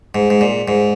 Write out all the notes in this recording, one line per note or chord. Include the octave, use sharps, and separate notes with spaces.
G#2
G#2
A#2
G#2